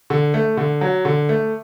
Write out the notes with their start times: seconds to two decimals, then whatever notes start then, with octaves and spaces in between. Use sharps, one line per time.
0.10 D3
0.34 A3
0.57 D3
0.81 F#3
1.05 D3
1.29 A3